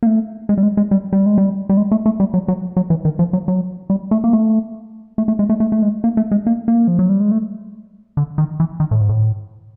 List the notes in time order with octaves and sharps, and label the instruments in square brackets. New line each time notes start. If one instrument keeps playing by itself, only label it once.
[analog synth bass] A#3
A3
G#3
G3
G#3
G#3
G3
G3
G#3
G3
G3
G#3
A3
A3
G3
F#3
F#3
F#3
E3
D#3
F3
F#3
F#3
G3
A3
A#3
A3
A3
A3
G#3
A3
A3
A3
G#3
A#3
A3
G#3
A#3
A#3
F3
F#3
G3
G#3
A3
D3
D#3
E3
D#3
A2
G#2
A2